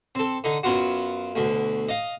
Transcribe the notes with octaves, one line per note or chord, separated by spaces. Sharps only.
C4 A4
D3 D#4
F#2 B3 F4 F#4
D2 B2
D#5 F5